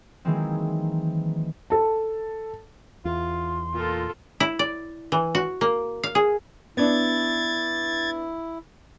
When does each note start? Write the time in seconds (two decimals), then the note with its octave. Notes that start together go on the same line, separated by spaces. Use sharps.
0.25 D#3 E3 F#3 G#3 A#3 C4
1.70 A4 A5
3.05 E2 F4 C6
3.74 A#2 F4 A4
4.40 E4
4.59 D5
5.12 E3
5.35 F#4
5.61 A#3
6.03 F5
6.15 G#4
6.77 B3 D4 E4 G#6 A6